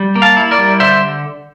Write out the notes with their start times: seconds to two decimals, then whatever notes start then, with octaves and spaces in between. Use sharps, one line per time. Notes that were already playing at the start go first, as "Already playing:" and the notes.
Already playing: G3
0.16 A#3
0.22 F5 A5
0.37 E4
0.51 A#4 D5
0.59 G3
0.80 D3 C5 E5